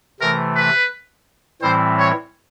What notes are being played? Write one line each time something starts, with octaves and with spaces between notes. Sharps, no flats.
C3 E3 A3 A#4
B4
A2 E3 G3 C4 E4 C5
C#5